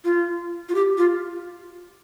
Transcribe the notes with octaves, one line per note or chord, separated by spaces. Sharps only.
F4
F4
G4
F4